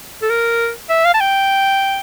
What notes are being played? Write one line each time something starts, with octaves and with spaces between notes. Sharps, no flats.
A4
A#4
E5
F5
A5
G5